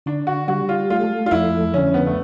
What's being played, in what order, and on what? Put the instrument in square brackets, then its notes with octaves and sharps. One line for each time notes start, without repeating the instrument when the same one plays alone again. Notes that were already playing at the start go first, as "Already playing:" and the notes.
[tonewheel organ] D3 [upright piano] D4
[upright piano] F#4
[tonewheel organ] G3 [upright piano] F#4
[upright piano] F4
[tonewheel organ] A3 [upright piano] F4
[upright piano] F4
[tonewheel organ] F2 [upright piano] E4
[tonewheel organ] D3 [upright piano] C#4
[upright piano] B3
A3